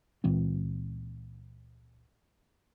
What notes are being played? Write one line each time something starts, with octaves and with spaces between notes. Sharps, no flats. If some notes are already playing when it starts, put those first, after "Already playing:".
C#2 A#2 E3 C4